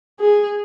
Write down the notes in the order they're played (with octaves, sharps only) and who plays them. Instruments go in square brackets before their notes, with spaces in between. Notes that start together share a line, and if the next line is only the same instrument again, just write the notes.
[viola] G#4